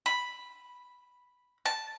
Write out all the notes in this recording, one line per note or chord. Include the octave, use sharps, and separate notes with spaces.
B5
A5